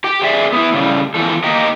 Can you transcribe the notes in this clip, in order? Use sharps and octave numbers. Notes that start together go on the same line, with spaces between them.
G4 G5
G4 G#4 C5 D5 E5
B3 C#4 E4
A2 C#3 G3
E2 E3 F3 A4
A#3 D#4 G4 A#4